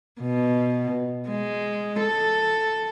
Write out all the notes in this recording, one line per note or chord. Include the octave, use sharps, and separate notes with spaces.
B2
G#3
A4